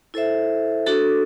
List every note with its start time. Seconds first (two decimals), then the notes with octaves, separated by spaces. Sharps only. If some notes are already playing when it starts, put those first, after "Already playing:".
0.14 E4 A4 C5 E5
0.86 D4 F#4 A4